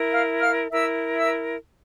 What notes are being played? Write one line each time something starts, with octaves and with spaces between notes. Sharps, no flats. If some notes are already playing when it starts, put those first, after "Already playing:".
Already playing: E4 A#4
F5 F6
F5 F6
E4 A#4 E5 E6
E5 E6